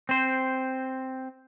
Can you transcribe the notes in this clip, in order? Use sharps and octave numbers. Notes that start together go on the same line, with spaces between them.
C4 C5